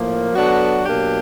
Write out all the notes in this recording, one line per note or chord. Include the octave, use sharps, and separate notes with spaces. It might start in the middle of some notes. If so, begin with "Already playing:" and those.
Already playing: A2 F3 A#3
F#3 B3 D4 F#4 A4
B2 F#3 A#3 D4 G4